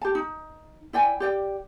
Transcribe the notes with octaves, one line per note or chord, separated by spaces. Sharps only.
G4 A5
D#4
E4 D5 G5 G#5
G4 D5 G5